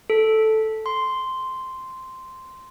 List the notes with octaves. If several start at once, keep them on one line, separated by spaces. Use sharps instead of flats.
A4
C6